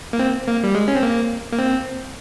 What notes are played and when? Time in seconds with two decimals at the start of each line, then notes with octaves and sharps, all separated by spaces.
0.13 A#3
0.19 C4
0.48 A#3
0.64 G3
0.75 G#3
0.88 C#4
0.95 C4
1.03 A#3
1.52 A#3
1.59 C4